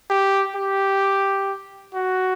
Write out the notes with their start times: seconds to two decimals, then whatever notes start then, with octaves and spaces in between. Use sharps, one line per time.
0.10 G4
0.56 G4
1.94 F#4